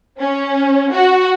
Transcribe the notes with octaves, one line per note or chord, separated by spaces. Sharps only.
C#4
F#4